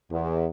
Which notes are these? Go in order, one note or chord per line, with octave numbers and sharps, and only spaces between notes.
E2